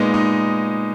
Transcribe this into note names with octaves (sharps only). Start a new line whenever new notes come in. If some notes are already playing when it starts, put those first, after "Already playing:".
Already playing: A#2 G#3 B3 D#4
D#4